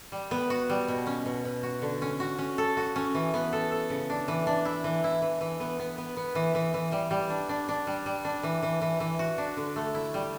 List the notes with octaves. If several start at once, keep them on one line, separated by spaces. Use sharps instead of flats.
G3
B3
F#4
G3
B2
C#4
B2
B2
F#4
D3
C#4
F#4
C#4
A4
F#4
C#4
E3
B3
A4
A4
C#3
D4
E3
D4
E4
E3
E4
E3
E3
B3
B3
B3
B3
E3
E3
E3
G3
G3
D4
D4
D4
G3
G3
D4
E3
E3
E3
E3
F#4
D4
D3
A3
E4
G3